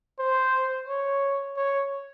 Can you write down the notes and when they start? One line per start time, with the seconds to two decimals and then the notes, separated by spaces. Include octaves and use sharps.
0.19 C5
0.87 C#5
1.57 C#5